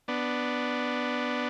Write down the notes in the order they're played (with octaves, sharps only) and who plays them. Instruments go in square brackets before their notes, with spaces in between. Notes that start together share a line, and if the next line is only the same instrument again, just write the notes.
[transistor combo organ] B3 D4